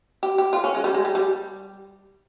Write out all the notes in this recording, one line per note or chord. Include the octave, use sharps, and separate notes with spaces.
G4
G4
F4
C#4
G#3
G3
G#3
G3
G3